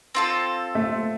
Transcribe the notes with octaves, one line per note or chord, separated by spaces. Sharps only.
C4 F4 A4
A3